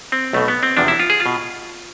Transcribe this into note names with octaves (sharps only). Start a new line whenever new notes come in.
C4
B1 B2 A3
B3
C4
E2 C3 F3 D4
E4
F4
G#4
F4
B2